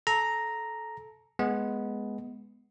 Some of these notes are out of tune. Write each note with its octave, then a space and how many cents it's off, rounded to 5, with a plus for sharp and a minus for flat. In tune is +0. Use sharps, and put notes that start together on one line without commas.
A4 -20 A#5 +0
G#3 +10 B3 +0